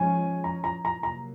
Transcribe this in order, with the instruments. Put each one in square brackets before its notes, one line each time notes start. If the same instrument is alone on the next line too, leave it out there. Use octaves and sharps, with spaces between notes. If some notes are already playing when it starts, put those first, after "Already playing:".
Already playing: [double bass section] G#2 F3 G#3 C#4 [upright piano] G#5
[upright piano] A#5
A#5
A#5
[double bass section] C3 F#3 A#3 [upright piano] A#5